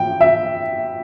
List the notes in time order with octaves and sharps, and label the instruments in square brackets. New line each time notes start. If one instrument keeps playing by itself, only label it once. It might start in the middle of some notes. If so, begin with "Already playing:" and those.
Already playing: [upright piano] G5
E5